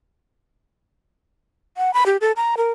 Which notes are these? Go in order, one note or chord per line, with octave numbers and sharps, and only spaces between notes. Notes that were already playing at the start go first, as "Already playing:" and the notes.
F#5
B5
G4
A4
A#5
A#4